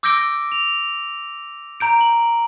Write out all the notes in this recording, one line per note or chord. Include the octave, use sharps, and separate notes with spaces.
D6 E6 G6 A#6 D7 G7
F7
A#5 G6 D7
F#7